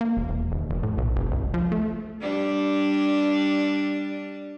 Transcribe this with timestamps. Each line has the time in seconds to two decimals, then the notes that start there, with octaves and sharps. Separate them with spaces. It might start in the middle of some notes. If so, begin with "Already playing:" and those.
0.01 A#3
0.17 E1
0.29 E1
0.52 D#1
0.70 F1
0.83 A2
0.98 B1
1.16 F#1
1.32 C#2
1.54 F3
1.72 A3
2.21 G3 D4